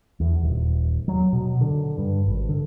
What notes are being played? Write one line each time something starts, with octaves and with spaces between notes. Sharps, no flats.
E2
D#1
F#3
B2
D3
G2
G#1
D3